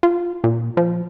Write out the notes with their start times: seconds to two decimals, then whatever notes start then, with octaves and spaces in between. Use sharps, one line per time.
0.03 F4
0.44 A#2
0.77 F3